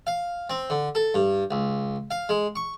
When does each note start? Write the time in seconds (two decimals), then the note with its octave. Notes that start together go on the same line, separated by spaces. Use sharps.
0.07 F5
0.50 C4
0.70 D3
0.95 A4
1.14 G2
1.51 C#2
2.11 F5
2.29 G#3
2.56 C#6